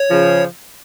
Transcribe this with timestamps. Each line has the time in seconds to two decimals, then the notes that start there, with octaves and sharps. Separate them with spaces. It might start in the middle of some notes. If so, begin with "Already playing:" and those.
Already playing: C#5
0.10 C#3 F3